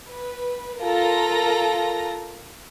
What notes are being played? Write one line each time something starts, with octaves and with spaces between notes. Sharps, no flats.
B4
F4 A4 A#4 A#5 A#6